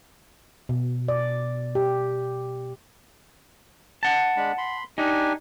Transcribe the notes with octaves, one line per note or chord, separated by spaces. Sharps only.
B2
D5
G4
F#5 A5
G#3 D4 B5
B5 C6
D4 D#4 G4 G#5